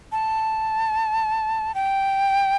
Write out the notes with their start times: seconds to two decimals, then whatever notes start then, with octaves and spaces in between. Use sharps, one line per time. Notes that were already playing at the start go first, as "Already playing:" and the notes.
0.12 A5
1.75 G5